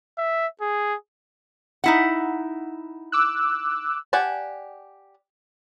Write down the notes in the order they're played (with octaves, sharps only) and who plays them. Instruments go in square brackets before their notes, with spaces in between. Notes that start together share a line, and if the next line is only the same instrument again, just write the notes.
[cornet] E5
G#4
[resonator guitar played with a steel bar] D#4 E4 F#5
[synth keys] D6 E6 F#6
[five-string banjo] G4 D5 F#5 G#5 A5